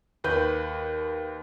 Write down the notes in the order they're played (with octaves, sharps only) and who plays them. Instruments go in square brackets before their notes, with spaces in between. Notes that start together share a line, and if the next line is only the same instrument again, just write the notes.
[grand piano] D#2 B4 G6